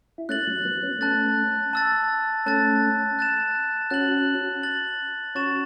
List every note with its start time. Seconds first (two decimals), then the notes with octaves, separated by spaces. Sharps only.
0.18 E4
0.29 A3 C#4 F#6 A6 F#7
0.47 F#3
0.65 F#3 B3
0.83 C#4
0.91 B3
0.99 A3 C#4 A5 F#6 A6
1.73 A5 E6 A6
2.46 A3 C#4 A5 F#6 A6
3.19 F#6 A6 E7
3.91 C#4 F#4 F#6 A6 F#7
4.63 F#6 A6 F#7
5.35 C#4 F#4 C#6 A6 E7